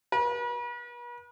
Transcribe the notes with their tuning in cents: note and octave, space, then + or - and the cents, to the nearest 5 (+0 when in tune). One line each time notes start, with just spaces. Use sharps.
B4 -40